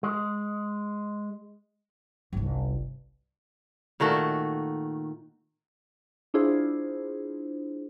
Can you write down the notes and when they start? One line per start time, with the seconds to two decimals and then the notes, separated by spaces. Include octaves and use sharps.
0.03 G#3
2.33 G1 C2
4.00 A#2 D#3 A3 F#4
6.34 D4 E4 F4 G#4 C5